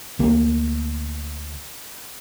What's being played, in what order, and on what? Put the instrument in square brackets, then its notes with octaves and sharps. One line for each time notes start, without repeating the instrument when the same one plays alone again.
[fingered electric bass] D2 A#3